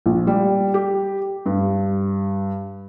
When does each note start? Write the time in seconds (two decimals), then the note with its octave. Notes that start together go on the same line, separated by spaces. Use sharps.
0.06 A#1
0.27 G3
0.74 G4
1.46 G2